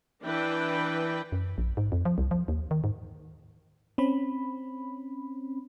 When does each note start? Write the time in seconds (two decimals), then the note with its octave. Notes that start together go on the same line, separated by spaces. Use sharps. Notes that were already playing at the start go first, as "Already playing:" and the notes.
0.24 E3 D4 B4 G5
1.32 F#2
1.58 A#1
1.77 G#2
1.92 F2
2.05 F3
2.18 C2
2.31 F3
2.48 D#2
2.71 D#3
2.84 G#2
3.98 C4 C#4 B5